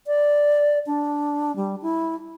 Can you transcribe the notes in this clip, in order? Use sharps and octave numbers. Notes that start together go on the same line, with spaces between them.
D5
D4
G3
E4